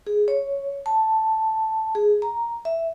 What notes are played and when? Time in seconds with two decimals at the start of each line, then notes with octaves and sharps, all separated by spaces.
0.07 G#4
0.28 C#5
0.86 A5
1.95 G#4
2.22 A#5
2.65 E5